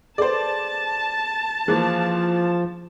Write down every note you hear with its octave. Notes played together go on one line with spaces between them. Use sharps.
G#4 A4 B4 C5 D5 A5
E3 F3 A#3 G#4